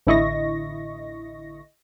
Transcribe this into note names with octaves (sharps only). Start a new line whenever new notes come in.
A1 D3 E4 D#5 C#6 A#6